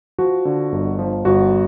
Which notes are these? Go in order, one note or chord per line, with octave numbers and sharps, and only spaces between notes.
F3 F#4
D3
G1
F3
G1 F#4